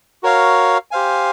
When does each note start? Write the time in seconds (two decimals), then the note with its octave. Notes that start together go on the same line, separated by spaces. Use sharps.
0.23 F#4 A#4 C#5 F5
0.91 G4 C5 F5 G#5